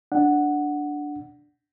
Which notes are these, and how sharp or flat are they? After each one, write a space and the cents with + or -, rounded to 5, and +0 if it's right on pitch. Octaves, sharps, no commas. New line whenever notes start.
D4 +0 F#5 +0